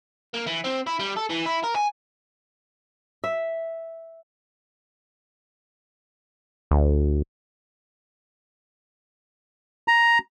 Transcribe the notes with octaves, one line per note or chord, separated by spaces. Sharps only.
A#3
E3
C4
E4
G3
A4
E3
E4
A#4
G#5
E5
D2
A#5